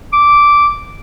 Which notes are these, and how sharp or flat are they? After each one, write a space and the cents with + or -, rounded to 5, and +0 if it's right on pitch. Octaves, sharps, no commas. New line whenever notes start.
D6 -10